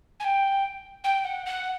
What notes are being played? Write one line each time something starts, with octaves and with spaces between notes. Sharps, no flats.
G#5
G5
G5
F#5
F#5